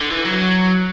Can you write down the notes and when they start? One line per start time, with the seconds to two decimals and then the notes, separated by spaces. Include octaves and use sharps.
0.01 D3
0.11 E3
0.25 F#3